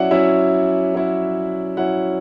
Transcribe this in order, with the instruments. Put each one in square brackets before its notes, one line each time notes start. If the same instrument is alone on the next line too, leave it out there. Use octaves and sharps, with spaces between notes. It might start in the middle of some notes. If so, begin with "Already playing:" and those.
Already playing: [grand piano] F#3 C#4 E4 D5 E5 F#5
F#3 C#4 E4 E5
F#3 C#4 E4
F#3 C#4 E4 F#5